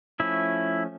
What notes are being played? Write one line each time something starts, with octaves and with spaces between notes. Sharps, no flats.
F3 A3 C#4 E4